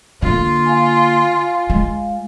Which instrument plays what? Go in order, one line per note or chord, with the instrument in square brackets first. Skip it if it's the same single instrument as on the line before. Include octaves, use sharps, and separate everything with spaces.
[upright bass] D3 A#3 [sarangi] F4
[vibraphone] F5 G#5
[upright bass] G#3